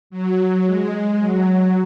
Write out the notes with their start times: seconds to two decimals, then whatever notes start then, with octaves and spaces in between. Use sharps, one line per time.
0.10 F#3
0.65 G#3
1.20 F#3